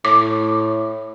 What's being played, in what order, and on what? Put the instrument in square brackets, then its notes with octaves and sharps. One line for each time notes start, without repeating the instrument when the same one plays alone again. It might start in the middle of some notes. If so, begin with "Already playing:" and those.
[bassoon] A2 [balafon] D6